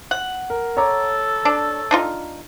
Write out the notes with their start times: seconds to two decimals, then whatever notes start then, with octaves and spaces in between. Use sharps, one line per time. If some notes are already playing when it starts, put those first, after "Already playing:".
0.11 F#5
0.50 A#4
0.77 A4 C#5 A#5 D6
1.45 D4
1.91 D4 D#4 F4